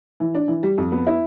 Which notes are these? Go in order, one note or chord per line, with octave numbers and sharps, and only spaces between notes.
E3
D4
E3
G3
F2
B3
E4